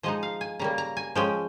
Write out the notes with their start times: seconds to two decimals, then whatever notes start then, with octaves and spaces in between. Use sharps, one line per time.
0.03 F3 G#3 D#4 D#5
0.23 F5
0.41 G#5
0.59 C#3 G3 A#3 A#5
0.78 A#5
0.97 G#5
1.15 F3 G#3 C#4 G5